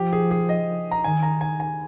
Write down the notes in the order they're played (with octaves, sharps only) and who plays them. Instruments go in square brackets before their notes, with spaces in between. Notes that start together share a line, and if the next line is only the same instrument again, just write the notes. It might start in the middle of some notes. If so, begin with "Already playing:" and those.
Already playing: [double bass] F3 [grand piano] G4
[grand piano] G#4
G#4
D#5
A#5
[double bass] D#3 [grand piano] G#5
[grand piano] A#5
G#5
G#5